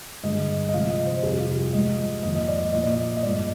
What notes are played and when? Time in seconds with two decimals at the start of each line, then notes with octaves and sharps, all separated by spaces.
0.23 G2 D3 G#3 D#5
0.69 D#5
0.74 C3 F3 G#3 F5
0.90 D#5
1.06 C5
1.23 F2 C3 G3 G#4
1.40 F4
1.56 G4
1.73 G#2 F3 G#3 D#5
2.23 F2 D#3 A#3 D#5
2.35 D#5
2.48 D5
2.61 D#5
2.73 A#2 F3 A#3 D#5
2.84 D5
2.95 D#5
3.17 D#5
3.23 G2 F3 G#3 D5